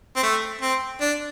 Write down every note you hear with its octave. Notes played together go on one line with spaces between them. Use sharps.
C4
A3
C4
D4